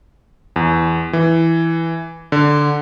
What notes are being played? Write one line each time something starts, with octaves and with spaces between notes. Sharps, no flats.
E2
E3
D3